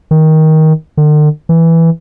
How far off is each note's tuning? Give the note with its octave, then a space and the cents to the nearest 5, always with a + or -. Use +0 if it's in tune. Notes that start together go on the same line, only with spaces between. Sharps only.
D#3 +15
D3 +45
E3 +0